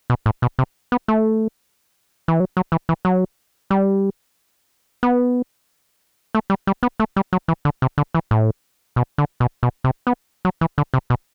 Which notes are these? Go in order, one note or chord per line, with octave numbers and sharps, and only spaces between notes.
B2
A2
B2
C3
B3
A3
E3
F#3
F#3
E3
E3
F#3
G3
B3
A3
G3
G3
B3
A3
G3
F#3
E3
D3
C3
D3
E3
A2
B2
D3
B2
B2
C3
B3
F#3
E3
D3
C3
B2